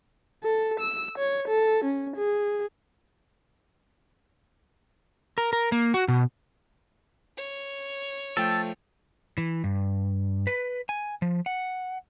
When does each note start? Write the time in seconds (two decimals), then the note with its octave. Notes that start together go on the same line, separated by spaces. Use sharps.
0.44 A4
0.80 E6
1.18 C#5
1.48 A4
1.85 C#4
2.16 G#4
5.38 A#4
5.53 A#4
5.72 A#3
5.94 F#4
6.08 B2
7.37 C#5
8.37 F3 A3 A4 G5
9.38 E3
9.64 G2
10.47 B4
10.89 G#5
11.22 F3
11.46 F#5